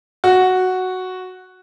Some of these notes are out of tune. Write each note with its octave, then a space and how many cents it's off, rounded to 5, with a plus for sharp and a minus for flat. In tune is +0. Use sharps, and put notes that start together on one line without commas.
F#4 +0